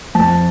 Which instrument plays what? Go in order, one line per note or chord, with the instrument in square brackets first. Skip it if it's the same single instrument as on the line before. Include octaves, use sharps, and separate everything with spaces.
[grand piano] F2 A5